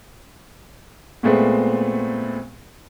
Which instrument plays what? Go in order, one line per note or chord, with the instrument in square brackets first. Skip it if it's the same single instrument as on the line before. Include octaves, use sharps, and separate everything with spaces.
[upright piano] A#2 G#3 A3 B3 C4